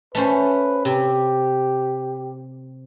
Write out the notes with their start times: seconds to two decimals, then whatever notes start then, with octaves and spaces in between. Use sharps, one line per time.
0.15 A3 C#4 B4 C5
0.85 C3 G4